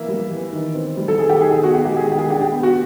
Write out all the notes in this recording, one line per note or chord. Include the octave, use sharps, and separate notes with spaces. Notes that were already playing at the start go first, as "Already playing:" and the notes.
Already playing: E3 A#3 E5
G3
E3
D#3
C4
G3
A4
D#3 G#4
G4
D#3 G#4
G#4
B3 F#4
G4
G#3 G4
G#4
D#3 G4
G#4
D4 G4
G4
B3
F#4